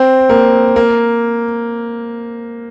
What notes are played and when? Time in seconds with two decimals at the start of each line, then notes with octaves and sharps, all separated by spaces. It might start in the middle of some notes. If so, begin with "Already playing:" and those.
Already playing: C4
0.29 A#3
0.76 A#3